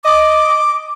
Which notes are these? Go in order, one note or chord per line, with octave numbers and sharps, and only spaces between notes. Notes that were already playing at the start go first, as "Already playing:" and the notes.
D#5 D6